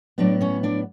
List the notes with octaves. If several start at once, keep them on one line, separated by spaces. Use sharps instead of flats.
A2 F#3 B3 D4 D5
C#4 C#5
D4 D5